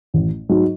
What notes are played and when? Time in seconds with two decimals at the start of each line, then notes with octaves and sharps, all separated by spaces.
0.14 A1
0.49 G#2 F#3